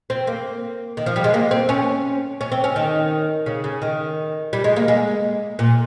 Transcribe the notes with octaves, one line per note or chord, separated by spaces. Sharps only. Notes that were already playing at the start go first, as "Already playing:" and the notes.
C4
A#3
D#3
F3
G3
G#3
A#3
C4
C#4
C#4
C4
C#4
D#3
C#3
C#3
D#3
G3
G#3
A#3
G#3
A#2